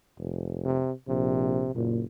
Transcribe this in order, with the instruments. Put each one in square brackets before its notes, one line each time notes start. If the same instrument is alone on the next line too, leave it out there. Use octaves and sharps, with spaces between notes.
[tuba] F1
[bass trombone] C3
[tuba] A#1 [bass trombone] C3
[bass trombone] F#1 [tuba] A#2